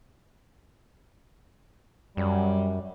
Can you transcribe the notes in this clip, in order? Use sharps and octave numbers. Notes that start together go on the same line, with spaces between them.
F#2 G3